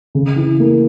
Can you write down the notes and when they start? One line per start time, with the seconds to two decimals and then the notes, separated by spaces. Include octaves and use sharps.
0.15 C#3
0.36 E3
0.60 A#3